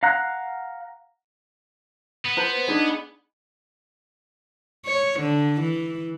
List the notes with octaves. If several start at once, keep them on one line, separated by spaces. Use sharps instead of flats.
F5 F#5 A#5 F#6
B3
B4 C5 A#5
D4 D#4 G#4
C#5
D3
E3